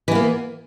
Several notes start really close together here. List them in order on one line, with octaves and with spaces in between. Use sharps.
E3 B3 A#3